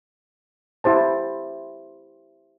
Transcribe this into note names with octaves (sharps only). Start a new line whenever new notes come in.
E4 G4 C5 A5